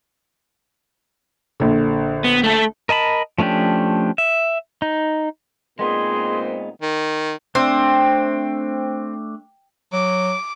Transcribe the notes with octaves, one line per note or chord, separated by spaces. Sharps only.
A#1 D3
B3
A3 A4
A#4 D#5 A5 B5
F3 A3 C#4 D4 G4
E5
D#4
A#2 G#3 B3 C4 D#4 G#4 C6
D#3
A3 C4 D4 E5
F#3 D6